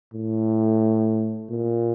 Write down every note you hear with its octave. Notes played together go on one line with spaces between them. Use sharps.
A2
A#2